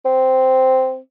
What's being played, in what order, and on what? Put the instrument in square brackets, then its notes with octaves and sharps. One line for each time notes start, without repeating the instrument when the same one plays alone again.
[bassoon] C4